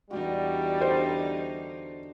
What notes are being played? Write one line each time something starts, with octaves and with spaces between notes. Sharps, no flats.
E2 G3 D4 D#4 F#4 G4 D5
D3 C5